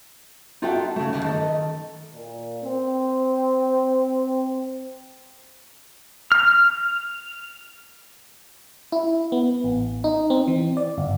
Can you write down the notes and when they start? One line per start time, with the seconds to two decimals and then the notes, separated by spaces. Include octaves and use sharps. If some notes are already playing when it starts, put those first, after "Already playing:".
0.62 D#4 F4 F#4 A4 E5 G5
0.96 C#3 A3
1.13 D#2
1.24 D#3 A4 D#5
2.14 A#2
2.63 C4
6.32 F6
8.92 E4
9.32 B3
9.64 A1
10.04 D#4
10.30 C4
10.48 E3
10.77 D5
10.98 G1